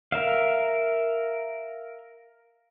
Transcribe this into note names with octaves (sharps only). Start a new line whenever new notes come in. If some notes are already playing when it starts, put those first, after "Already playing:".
A#4 E5 F5